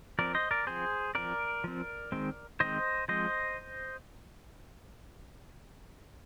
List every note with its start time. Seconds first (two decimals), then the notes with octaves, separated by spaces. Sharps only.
0.19 F3 C4 A#4 D5
0.35 C5 D#5
0.51 A#4 D5
0.67 F3 C4 G#4 C5
1.15 F3 C4 A#4 D5
1.64 F3 C4
2.12 D#3 G#3 C4
2.60 D#3 G#3 C4 C5 D#5
3.08 F3 G#3 C4 C5 D#5